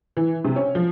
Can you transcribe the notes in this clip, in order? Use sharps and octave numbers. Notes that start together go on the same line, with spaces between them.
E3
C3
C#4
F3